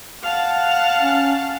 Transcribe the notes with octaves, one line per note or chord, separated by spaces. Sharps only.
F5 F#5 A5
C#4